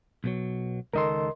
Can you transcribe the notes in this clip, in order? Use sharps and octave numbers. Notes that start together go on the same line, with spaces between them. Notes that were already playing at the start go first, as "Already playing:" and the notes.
B1 B2 F#3
C#2 D#3 A4 A#4 D#5 C6